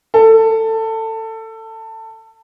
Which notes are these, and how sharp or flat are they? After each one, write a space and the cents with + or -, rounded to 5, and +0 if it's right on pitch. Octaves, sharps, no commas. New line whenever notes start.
A4 +20